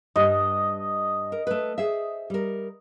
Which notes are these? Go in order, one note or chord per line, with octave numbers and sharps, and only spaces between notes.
G2 G3 D#5
A#4
A3 B4
G#4 C5 E5
G3 A#4